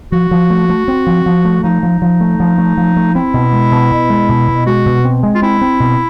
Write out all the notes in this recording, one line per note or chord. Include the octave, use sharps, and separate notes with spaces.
F3 F#4
F3
A3
A3
C4
F3
F3
A3
F3 D#4
F3
F3
A3
F3
A3
F3
A3
C4 E4
B2
G#3
B2
B2
G#3
B2
B2
G#3 F#4
B2
C4
G#3
F4
C4 E4
C4
B2